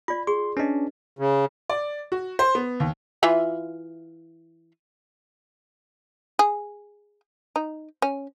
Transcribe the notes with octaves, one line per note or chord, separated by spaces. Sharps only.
F4 D5 B5
G#4 C6
C#4 D4 B4 D#5
C#3
D5
F#4
C5
B3
D#2
E3 F4 E5
G#4
D#4
C#4